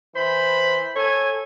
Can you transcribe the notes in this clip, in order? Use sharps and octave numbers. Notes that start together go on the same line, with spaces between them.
E3 C5 B5
A4 C#5 G#5